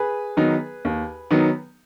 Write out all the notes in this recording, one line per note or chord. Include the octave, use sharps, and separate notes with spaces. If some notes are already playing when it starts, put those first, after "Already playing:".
Already playing: G#4 B4
D#3 F#3 B3 D#4
D#2
D#3 F#3 B3 D#4